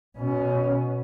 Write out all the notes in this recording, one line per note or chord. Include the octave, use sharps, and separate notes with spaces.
B2 C#4